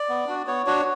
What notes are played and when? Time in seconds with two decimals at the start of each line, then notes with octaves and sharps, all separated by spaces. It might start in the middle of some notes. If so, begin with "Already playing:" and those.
Already playing: D5
0.09 B3
0.27 D4 F#4
0.47 B3 C#5
0.66 D4 F#4 C#5